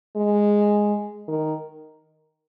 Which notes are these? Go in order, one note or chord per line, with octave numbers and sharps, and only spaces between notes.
G#3
D#3